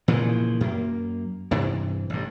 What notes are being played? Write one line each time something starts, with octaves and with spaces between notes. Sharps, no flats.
A#2 C#3 E3 F3
F#2 A#3
G2 C3 E3
A1 G2